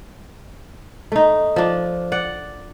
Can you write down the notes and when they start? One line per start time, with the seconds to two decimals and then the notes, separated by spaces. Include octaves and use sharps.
1.12 A3 D#4
1.56 F3 D4
2.12 D5 F#5